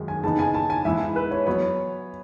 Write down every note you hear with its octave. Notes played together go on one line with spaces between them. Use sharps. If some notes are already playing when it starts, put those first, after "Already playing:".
Already playing: F#2 D#3 G#3
G#5
C#3 E3 B3 D#4 A5
G#5
A5
G#5
G#2 E3 B3 E4 E5
B4
C#5
F#3 B3 C#5